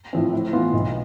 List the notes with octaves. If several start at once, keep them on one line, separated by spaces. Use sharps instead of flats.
A2 F3 C4
A2
E3 B3 F4 B4
B1